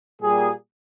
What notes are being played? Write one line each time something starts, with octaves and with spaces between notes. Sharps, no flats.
A#2 G3 A#3 G#4